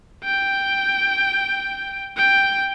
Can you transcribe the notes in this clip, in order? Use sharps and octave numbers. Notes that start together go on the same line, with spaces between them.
G5
G5